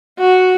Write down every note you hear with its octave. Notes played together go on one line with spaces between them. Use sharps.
F#4